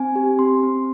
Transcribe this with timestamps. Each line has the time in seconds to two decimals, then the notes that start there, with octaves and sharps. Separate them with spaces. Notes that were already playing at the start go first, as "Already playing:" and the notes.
Already playing: C4 G#5
0.16 G4
0.39 C4 C6
0.63 C4